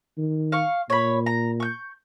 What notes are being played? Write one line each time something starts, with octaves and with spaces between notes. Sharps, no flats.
D#3
F5 C#6
A#2 C#5 B5
A#5
C#6 G6